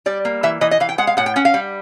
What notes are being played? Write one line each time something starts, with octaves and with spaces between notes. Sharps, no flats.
G3 D5
A#3
E3 E5
E3 D#5
D#5
E3 F5
G5
G#3 F#5
F5
A2 F#5
G5
C#4 F#5
F5
G3